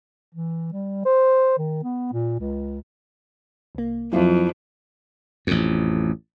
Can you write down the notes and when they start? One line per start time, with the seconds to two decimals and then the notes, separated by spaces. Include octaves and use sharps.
0.34 E3
0.72 G3
1.06 C5
1.58 D#3
1.84 B3
2.13 A#2
2.39 C#2
3.75 C2 A#3
4.13 F2 F#3 E4 F4
5.47 A1 F2